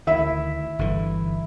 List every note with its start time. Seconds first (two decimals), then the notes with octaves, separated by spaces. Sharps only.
0.07 D2 D#3 E4 E5
0.79 G1 D3 E3